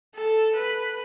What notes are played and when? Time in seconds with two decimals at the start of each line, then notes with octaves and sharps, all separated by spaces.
0.16 A4
0.56 B4